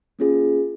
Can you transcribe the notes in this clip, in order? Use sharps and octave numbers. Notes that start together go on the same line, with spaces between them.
A#3 C#4 F4 G#4